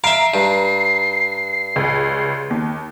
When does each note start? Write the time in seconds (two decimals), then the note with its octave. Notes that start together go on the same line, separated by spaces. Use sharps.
0.04 E5 F5 A#5 C7 D7
0.34 G2
1.76 C#2
2.50 D#2